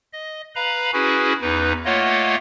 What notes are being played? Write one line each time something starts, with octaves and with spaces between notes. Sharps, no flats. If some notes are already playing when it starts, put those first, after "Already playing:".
D#5
B4 F5 A#5 B5
C#4 E4 F#4 G#4 B4
E2 D#4 B4
A3 A#3 F4 C#5 D#5 F#5